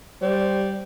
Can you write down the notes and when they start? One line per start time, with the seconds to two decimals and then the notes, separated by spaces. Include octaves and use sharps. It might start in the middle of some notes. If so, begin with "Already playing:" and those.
0.22 G3 C5